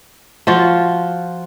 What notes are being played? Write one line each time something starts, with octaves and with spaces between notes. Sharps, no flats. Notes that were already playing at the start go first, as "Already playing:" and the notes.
F3 F4 F#4